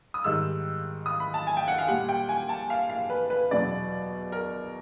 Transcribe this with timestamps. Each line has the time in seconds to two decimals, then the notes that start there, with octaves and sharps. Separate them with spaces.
0.14 D#6
0.24 G#2 D#3 G3 E6
1.06 D#6
1.20 B5
1.34 A5
1.47 G#5
1.57 G5
1.68 F#5
1.78 F5
1.88 A#2 G3 F#5
2.09 G5
2.29 G#5
2.49 A5
2.70 F5
2.90 F5
3.10 B4
3.30 B4
3.51 E2 B2 F#3 D5
4.32 A#4